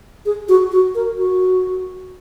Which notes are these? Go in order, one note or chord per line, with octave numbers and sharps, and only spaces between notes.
G#4
F#4
F#4
A#4
F#4